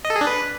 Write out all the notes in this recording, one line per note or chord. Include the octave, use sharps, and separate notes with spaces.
D#5
A4
G#4
D4
B4